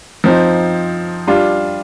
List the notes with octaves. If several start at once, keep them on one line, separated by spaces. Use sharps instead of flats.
F3 C4 D#4
G3 D4 F4